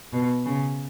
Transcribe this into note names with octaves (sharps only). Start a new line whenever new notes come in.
B2
C#3